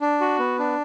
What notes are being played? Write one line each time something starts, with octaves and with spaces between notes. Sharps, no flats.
D4
F#4
B3
D4